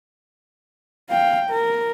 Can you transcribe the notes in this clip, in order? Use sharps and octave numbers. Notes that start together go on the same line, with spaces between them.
F5 G5
A#4